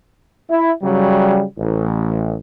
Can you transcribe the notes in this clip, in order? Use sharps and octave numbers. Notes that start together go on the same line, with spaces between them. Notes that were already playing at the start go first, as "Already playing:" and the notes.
E4
C#3 F#3 G3
A1